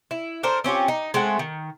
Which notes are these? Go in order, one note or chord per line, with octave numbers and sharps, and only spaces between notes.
E4
D4 A4 A#4 C5
C4 C#4 F4 G4
D#4
G#3 A3 C4 F#5
D#3